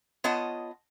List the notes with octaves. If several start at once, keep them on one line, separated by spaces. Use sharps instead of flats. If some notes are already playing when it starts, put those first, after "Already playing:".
B3 F4 C#5 D#5 F#5 A5